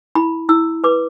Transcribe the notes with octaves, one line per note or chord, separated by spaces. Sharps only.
E4 B5
E4 E6
B4 D6